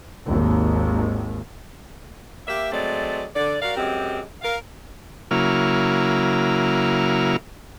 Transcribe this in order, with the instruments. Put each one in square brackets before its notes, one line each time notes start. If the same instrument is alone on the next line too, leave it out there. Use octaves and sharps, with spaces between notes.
[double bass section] G#1 D#2
[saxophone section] A#3 G4 E5
F#3 G#3 A3 C4 D5
D3 D5
F#4 A#4 D5 F5
F#2 G#3 C4 G4
A#4 F5
[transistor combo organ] C#3 F#3 A#3 E4 F6